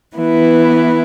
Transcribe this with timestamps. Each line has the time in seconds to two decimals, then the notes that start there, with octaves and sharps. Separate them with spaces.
0.16 E3 B3 E4 B4